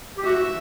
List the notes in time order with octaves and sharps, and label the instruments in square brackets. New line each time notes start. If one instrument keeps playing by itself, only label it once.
[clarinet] G4
[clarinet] F#4 [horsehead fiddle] E5
[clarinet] F#4